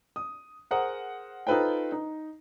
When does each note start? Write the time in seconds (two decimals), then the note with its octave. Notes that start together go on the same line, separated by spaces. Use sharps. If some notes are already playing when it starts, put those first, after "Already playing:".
0.16 D#6
0.71 G#4 A#4 C5 F#5 D#6
1.47 D#4 F4 A4 B4 C5 G5
1.92 D#4